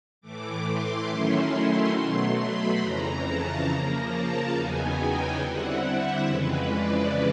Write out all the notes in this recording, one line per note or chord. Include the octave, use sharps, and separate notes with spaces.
A2 E3 A3 D6
C6
D#3 F#3 A3 C#4 E4 C6
C6
B2 F#3 A3 C6
B5
F2 C#3 E3 A#5
A5
C#3 F3 A#3 A#5
A5
E2 C#3 F#3 B3 D#4 G#5
G5
D3 G3 C4 E4 F#5
E5
F2 C#3 E3 G#3 B4
D5